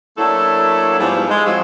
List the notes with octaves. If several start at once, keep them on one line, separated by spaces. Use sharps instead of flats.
F#3 A3 A#3 D4 E4 A4
G#2 F3 G3 B3 E4 F4
G#3
F3 F#3 A3 C4 E4 F4